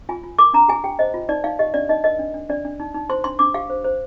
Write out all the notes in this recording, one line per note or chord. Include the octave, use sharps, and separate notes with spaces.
F4 G#5
F4
A#4 D6
D4 A#5
G4 G#5
G4 G5
C5 D#5
F4
D#4 D5
D#4 F5
G4 D#5
D4 D5
D#4 D#5
A#4 D#5
D4
D4
D4 D5
D4
D#4
D#4
C5 C6
D4 C6
D4 D6
G4 F5
C5
C5